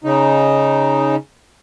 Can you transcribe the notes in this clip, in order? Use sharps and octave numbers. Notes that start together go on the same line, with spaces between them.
C#3 D#4